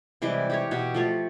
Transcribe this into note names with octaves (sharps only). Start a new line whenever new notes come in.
C3 E3 G3 G#3
G4 G#4 C#5
B2 G4
F3 A3 C#5